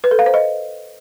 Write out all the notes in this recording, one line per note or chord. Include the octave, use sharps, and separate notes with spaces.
B4
A4
F5
C5
D#5